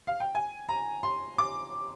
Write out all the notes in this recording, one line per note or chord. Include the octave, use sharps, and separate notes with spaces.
F5
G5
G#5
A#5
C6
D6